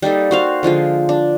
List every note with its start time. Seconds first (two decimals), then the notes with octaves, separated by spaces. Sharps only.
0.02 G3 A#3 D#4 A4
0.31 F#4 C5 F5
0.63 D3 F3 G#3 F4
1.09 D4